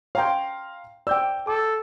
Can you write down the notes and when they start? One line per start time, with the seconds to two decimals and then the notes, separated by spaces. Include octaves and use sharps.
0.15 C#5 F5 G5 A#5 C6
1.07 D5 G5 E6 G6
1.47 A4 D6